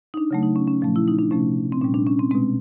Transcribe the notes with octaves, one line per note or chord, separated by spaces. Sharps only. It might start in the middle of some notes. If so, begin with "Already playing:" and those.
D#4
D4
C#3 F#3 A3
D#4
C#4
C#4
A#2 F3 A3
E4
D#4
D4
C3 F3 A3 C#4
C4
A#2 G3 C#4
D4
C#4
C4
B2 G#3 C4